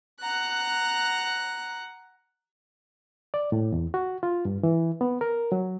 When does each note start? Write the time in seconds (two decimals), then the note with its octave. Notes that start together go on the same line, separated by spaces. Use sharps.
0.22 F#5 A#5 F#6
3.34 D5
3.52 A2
3.72 E2
3.94 F#4
4.23 F4
4.45 G2
4.63 E3
5.01 B3
5.21 A#4
5.52 F#3